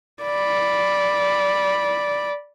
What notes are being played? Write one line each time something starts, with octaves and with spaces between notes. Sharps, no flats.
D5 B5